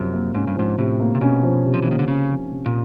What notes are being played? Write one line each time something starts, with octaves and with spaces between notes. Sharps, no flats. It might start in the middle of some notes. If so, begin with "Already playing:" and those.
Already playing: F#2 C3 F3 C#4
A#3
G#2 C#4
G2
G#2 F3
A2 C3
A#3
C3
B2 C#4
F3
C3
F3
E3
D#3 A#3
D3
C#3 C#4
F3
C3
A#2